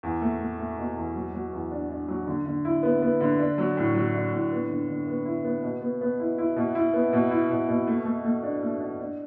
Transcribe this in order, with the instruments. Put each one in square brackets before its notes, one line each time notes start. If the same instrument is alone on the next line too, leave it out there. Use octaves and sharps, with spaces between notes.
[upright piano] E2
A3
A3
A3
B2
E2
F#3
F#3
E2
D4
D4
F#3
D3
D3
E4
B3
B3
D3
D4
F#3
A2
F#3
D4
A2
B3
D3
D3
B3
E4
B3
B2
B3
B3
E4
E4
B2
E4
B3
B2
E4
B2
B2
A3
A3
A3
D4
A3
D4
D4